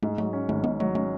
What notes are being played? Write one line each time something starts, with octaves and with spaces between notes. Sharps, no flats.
G#2 A3
F#3 A3
C#4
G#1 A3
G#2 B3
F#3 A3
A3 C#4